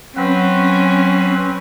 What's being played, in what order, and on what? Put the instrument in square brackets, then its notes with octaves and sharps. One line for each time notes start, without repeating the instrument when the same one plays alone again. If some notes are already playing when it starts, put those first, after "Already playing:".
[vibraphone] F#3 [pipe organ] C4 B4 [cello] C#4